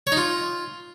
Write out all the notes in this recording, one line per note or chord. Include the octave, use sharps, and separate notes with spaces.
C#5
D#4
F4